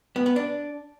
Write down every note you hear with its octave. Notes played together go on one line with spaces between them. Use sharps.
B3
B3
D4